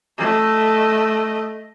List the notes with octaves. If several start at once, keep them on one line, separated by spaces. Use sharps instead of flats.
A3 D#5